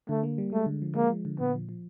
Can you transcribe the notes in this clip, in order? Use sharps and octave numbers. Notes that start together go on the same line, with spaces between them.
D3 A3
A#3
G3
G#3 A3
D3
F3
G#3 A#3
F3
D3
A#2 B3
F3
F3